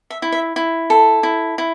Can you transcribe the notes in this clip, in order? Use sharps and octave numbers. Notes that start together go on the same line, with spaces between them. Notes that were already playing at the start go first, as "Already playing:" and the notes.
E5
E4
E5
E4
A4
E4
E4